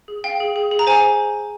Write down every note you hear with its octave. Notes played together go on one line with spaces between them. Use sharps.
G#4
F5 G5
G#4
G#4
G#4
A#5
C5 G#5